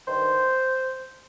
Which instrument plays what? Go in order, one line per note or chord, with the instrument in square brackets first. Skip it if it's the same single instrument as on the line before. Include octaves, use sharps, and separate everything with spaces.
[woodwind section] G2 D#3 C5